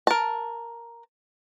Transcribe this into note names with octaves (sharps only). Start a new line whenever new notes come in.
A#4 A5